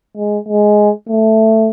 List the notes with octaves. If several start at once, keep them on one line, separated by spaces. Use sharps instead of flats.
G#3
G#3
A3